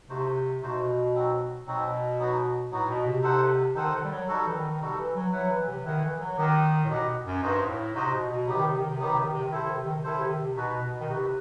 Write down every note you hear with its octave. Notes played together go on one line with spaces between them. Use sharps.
C3 A3 D#4 F#4 C5
B2 A3 D#4 F#4 C5
F#3 C4 D#4 F#4
B2 F#3 C4 D#4 F#4
F#3 B3 D#4 F#4
A2 F#3 B3 D#4 F#4
B2
C3
D#4 A4 C5 F#5
D#3 D#4 A4 C5 F#5
D#3
G3
F#3
G3 D#4 F#4 A4
E3
D#3
C3 G3 D#4 F#4 A4
E3
F#3
F#3 E4 B4 F#5
E3
C3
D#3 E4 B4 F#5
E3
F#3
D#3 D#4 G4 D#5 F#5
A2
B2 D#4 G4 D#5 F#5
F#2
G2 D#4 F#4 C5 D#5
A2
C3 D#4 F#4 C5 D#5
B2
B2
C3 F#3 B3 D#4 G4
D#3
C3
D#3
C3
D#3 F#3 B3 D#4 G4
C3
D#3
C3
D#3
C3 E4 A4 C5
D#3
C3
D#3
C3
D#3 E4 A4 C5
C3
D#3
C3
B2 D#4 F#4 B4
B2
D#3
C3 D#4 F#4 B4